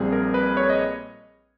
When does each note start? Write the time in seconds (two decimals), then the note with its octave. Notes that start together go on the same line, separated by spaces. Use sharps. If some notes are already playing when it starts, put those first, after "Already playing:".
Already playing: A#1 A#2 G3 C4 G#4
0.12 A#4
0.34 B4
0.57 C#5
0.70 D#5